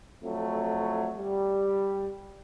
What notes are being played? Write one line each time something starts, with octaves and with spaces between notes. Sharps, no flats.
F2 F#3 A3
G3